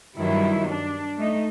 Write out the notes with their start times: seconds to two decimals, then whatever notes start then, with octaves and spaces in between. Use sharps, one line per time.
0.16 G2 D#3 F#3 G3 E4
0.69 D4
1.17 A3 D#4